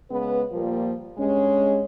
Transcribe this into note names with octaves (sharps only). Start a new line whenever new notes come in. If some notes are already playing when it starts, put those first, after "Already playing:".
C#3 G#3 B3 B4
A#2 F3 G3 A#3
G2 G#3 C#4